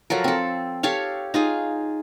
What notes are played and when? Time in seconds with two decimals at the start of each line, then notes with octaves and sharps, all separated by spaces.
0.10 F3 F#3 A4 A#4
0.24 C4 A4
0.83 G4 A4 C#5 F5
1.34 D#4 F4 G#4